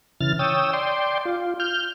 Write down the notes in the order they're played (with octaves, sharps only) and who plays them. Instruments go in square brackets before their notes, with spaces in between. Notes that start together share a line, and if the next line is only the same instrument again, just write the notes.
[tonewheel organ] C#3 E3 F6 A6
C#5 G5 D#6 E6
D5 G5 C6
F4
F6 G6